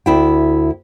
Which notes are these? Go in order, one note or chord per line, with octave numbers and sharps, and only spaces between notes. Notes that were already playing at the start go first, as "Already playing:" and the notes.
D2 E4 G5